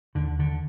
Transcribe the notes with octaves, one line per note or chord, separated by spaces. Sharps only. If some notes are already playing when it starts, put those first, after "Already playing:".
D#2 D3
D3